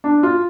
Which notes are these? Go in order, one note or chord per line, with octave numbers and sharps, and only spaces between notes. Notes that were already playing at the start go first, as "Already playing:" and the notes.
D4
F4